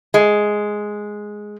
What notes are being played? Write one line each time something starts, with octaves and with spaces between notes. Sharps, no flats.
G#3